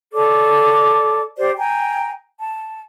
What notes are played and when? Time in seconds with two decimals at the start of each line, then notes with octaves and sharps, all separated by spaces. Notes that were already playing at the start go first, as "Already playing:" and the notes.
0.12 A4 C#5 D5 D6
1.37 G4 C5 D5
1.59 G5 G#5 A#5
2.40 A5